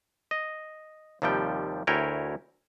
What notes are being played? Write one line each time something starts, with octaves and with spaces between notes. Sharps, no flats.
D#5
D#2 C3 F3 G3 G5
D2 E4 A#4 C#5 G5 G#5